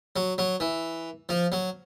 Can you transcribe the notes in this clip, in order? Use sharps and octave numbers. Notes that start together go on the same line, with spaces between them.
F#3
F#3
E3
F3
F#3